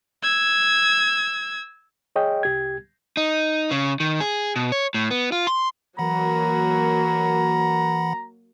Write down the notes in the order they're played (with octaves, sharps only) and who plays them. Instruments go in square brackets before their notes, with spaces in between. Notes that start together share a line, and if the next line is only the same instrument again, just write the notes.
[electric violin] E6 G#6
[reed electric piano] G#4 C#5 D#5 G5
C2 G4 G#6
[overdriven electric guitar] D#4
C#3
D#3
G#4
B2
C#5
A2
B3
F4
C6
[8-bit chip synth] E3 F#5 B5 [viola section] F#3 A#3 F#4 [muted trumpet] A#5